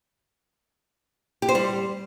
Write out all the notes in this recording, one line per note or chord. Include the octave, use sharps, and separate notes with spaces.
G4
C5
G3